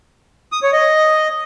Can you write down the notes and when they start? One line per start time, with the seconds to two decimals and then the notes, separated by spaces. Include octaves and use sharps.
0.52 D#6
0.63 C#5
0.73 D#5